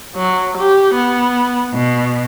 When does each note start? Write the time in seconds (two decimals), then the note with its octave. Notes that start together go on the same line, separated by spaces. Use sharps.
0.16 F#3
0.57 G4
0.94 B3
1.73 B2